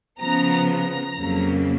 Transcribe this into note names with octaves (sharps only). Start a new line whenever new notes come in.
C#3 F3 B3 A#5
A#5
F2 C#3 F#3 A#3